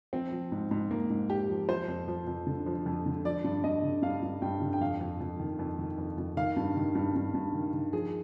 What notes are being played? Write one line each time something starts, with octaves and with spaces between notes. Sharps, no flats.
F3 C4
F3
G#2
G#2
G#2 A#3
G#2
G#2 G4
F3
F3 C5
F2
F3
F2
D3
F3
F2
D3
F3 D5
G2
G2 D#5
D3
G2 F5
G2
G2 G5
D3
G5
F2 F5
F2
F2
D#3
F2
D#3
F2
F2
D#3 F5
G2
D#3
G2
G2
G2
D#3
D#3
F3 G#4